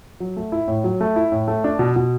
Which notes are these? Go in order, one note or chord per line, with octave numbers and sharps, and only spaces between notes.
F#3
A3
E4
A2
F#3
A3
E4
A2
A3
D4
B2
B2